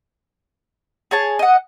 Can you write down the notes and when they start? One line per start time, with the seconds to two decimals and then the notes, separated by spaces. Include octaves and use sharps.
1.11 G#4 C#5 A5
1.39 D#5 F#5